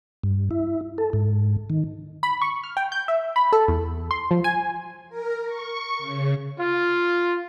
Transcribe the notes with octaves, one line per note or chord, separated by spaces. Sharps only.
G2
E4
A4
G#2
D#3
B5
C#6
F6
G5
G6
E5
B5
A4
E2
C6
F3
G#5
A#4
C#6
C#3
F4